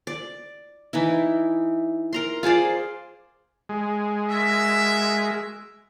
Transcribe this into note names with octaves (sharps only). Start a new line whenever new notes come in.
D5
E3 D#4 E4
A#4 A#5 C6
F4 G#4 C5 D5
G#3
F#4 A#4 E5